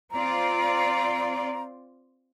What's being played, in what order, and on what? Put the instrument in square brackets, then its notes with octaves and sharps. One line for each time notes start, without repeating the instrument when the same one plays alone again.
[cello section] C4 F4 D5 [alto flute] A#5